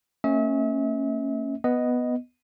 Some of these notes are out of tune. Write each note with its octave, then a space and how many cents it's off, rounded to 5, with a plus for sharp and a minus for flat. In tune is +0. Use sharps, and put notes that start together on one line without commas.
A#3 -40 C#4 -15 E5 -40
B3 +0 D#5 +0